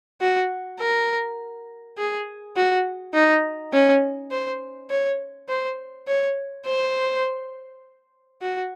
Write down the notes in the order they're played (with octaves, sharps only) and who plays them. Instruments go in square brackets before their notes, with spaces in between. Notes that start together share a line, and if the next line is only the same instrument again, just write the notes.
[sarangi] F#4
A#4
G#4
F#4
D#4
C#4
C5
C#5
C5
C#5
C5
F#4